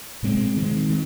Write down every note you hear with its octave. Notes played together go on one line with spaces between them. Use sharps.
A#2 G#3 C4
D#3 G#3 C4
D#3